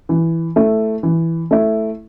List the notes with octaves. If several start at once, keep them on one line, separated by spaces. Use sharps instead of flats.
E3
A3 E4
E3
A3 E4